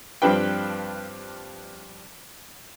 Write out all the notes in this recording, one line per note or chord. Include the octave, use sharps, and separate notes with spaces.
G2 F3 C4 D4 B4 G5